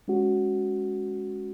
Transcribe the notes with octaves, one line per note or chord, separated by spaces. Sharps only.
G#3 C#4 F#4